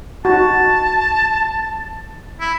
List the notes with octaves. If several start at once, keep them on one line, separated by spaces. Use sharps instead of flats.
D#4 F#4 A5
E4